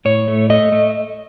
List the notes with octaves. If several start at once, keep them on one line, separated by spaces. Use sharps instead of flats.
A2 C#5
A3
A3 D#5
A3